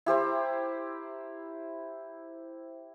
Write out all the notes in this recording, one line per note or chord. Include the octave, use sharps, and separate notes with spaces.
E4 G4 C5 A#5